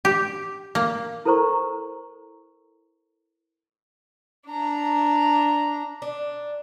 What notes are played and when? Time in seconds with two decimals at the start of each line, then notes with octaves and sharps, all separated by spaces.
0.05 G4
0.75 A#3
1.25 E4 A4 A#4 C5 A#5 C#6
4.48 D4 A#5
6.02 D4